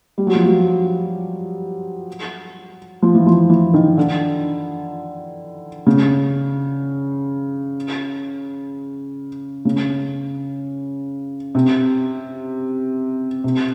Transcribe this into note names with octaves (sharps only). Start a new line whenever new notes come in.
G3
F#3
F3
F#3
F3
E3
F3
E3
D#3
D3
C#3
C#3
C3
C3